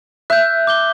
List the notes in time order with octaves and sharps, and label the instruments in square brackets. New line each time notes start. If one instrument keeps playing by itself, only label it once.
[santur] E5 [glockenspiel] F#6 G6
[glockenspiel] D6 G6 G7